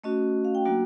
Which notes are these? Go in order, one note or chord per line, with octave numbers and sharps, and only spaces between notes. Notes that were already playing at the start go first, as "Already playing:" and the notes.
A3 C#4 F#4 D#5
F5
G5
F#3 A#3 D4 F#4